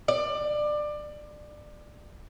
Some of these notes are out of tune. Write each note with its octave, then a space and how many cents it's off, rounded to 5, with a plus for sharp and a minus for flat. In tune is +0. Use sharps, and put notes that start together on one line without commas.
D5 +25